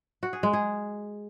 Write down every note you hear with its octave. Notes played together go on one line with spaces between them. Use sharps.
F#4
G#4
G#3
G#4